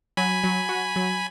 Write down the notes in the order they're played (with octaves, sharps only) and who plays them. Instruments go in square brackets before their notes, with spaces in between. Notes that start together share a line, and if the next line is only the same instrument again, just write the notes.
[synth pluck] F#3 [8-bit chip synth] G#5 B5
[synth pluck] F#3
F#4
F#3